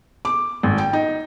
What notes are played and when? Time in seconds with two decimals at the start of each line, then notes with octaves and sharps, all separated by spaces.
0.25 D6
0.63 G#1
0.78 G5
0.93 D#4